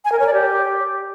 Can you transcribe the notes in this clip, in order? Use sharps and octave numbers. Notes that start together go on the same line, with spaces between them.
G#5
A#4
C#5
D5
G4